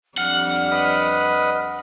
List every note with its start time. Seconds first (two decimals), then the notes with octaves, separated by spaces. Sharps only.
0.18 F2 G3 D4 F#5 F6
0.71 B4 D#5